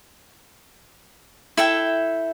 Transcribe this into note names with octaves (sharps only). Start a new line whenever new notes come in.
E4 A4 E5 G5